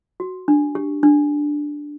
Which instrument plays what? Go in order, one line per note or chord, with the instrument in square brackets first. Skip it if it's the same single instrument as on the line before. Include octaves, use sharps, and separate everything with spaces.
[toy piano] F#4
D4
G4
D4